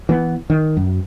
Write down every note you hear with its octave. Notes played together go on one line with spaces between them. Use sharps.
E3 B3
D#3
F#2